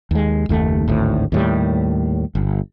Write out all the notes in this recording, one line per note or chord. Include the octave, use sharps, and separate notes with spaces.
D#2 G#3
F#1 D#2 A3
G#1 D2 A2
D#2 A2 G3
G1